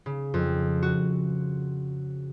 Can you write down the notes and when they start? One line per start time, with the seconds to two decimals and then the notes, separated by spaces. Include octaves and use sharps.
0.06 C#3
0.34 F2
0.82 F#4